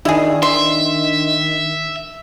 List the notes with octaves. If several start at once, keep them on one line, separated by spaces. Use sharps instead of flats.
D#3 D4 E4 G#4
D#3 E5 C6